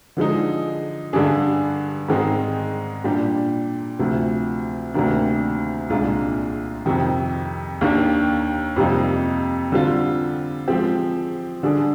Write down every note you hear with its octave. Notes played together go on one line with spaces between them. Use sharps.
D3 F3 G#3 D#4
G2 D3 G3 D4 G#4
G#2 D#3 G#3 C4 D#4
A#2 G3 D4 G4
D2 C3 F3
D2 C3 D#3 A#3 D4
C2 A#2 G#3 D4 F4
F2 C3 D#3
D#2 D#3 A#3 D4 G4
F2 C3 G3 A#3 D#4
D3 G3 C4 F4
F3 G#3 C4 G4
D3 G3 D4 G#4